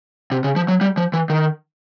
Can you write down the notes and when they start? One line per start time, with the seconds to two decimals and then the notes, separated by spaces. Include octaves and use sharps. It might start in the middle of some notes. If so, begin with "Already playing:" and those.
0.32 C3
0.44 C#3
0.56 F3
0.68 F#3
0.81 G3
0.97 F3
1.13 E3
1.30 D#3